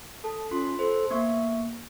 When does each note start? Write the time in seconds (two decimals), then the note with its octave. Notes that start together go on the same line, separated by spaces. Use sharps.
0.24 A4 A5
0.51 C#4 F4 C6
0.79 A4 C5 C6
1.11 A#3 B3 E5 C#6